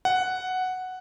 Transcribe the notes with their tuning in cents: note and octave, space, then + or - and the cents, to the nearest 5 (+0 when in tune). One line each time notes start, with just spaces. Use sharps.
F#5 +0